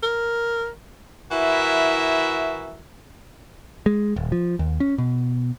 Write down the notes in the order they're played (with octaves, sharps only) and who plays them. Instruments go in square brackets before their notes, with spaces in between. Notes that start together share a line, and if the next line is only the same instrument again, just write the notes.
[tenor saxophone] A#4
[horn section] E3 E4 F#4 A#4 E5
[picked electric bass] G#3
D#1
F3
D#2
C#4
B2